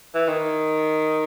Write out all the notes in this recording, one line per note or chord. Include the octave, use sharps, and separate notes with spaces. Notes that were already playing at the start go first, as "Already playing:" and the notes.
E3
D#3